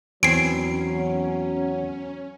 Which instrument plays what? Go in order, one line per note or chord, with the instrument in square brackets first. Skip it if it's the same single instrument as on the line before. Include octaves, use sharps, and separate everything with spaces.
[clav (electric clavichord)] E2 C4 G#5 [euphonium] F#3 [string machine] C#4 [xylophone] C7 D7